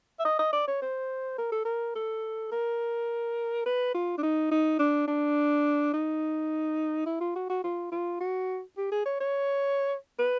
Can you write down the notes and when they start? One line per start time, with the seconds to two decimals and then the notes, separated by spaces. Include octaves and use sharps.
0.20 E5
0.25 D#5
0.39 D#5
0.53 D5
0.68 C#5
0.82 C5
1.38 A#4
1.52 A4
1.65 A#4
1.96 A4
2.52 A#4
3.66 B4
3.95 F4
4.18 D4
4.23 D#4
4.52 D#4
4.79 D4
5.08 D4
5.94 D#4
7.06 E4
7.21 F4
7.36 F#4
7.50 F#4
7.64 F4
7.92 F4
8.21 F#4
8.78 G4
8.92 G#4
9.06 C#5
9.20 C#5
10.19 B4